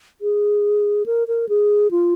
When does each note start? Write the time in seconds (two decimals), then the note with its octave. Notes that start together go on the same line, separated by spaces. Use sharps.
0.21 G#4
1.06 A#4
1.28 A#4
1.49 G#4
1.91 F4